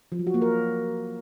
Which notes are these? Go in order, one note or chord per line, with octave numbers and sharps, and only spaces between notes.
F3
F#3
F#4
A#3
A#4